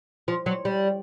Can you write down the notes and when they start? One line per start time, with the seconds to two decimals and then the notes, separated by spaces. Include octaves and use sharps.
0.28 F3
0.46 F#3
0.65 G3